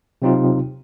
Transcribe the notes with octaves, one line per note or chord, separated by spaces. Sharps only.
C3 F#3 C4 D#4 F4